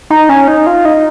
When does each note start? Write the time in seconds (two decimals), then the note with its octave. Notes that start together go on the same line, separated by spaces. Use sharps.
0.10 D#4
0.29 C#4
0.48 D#4
0.67 F4
0.85 D#4